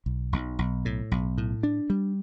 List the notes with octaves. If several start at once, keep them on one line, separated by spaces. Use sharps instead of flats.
B1
B1
B1
A2
B1
A2
D4
G3